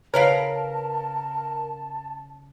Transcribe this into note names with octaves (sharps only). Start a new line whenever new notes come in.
C#3 A#4 B4 C#5 F5 A5 D7